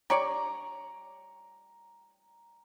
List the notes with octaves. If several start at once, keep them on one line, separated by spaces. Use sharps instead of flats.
G4 C#5 D5 A#5